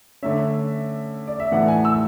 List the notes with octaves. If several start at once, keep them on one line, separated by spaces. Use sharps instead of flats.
D3 A3 C#4 E5
D5
E5
A2 E3 A3 E4 F#5
G#5
E6